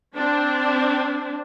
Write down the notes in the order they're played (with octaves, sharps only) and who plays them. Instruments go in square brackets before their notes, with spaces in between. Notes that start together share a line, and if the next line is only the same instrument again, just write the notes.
[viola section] C4 D4